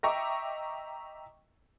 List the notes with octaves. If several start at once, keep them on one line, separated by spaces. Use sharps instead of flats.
D#5 E5 G5 A#5 C#6 D6